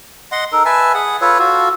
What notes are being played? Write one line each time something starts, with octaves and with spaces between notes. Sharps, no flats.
D#5 F#5 C6
D#4 A4 A#4
B4 E5 G#5 A5
G#4 F#5
F4 A4 B4 C#5
F4 F#4 A4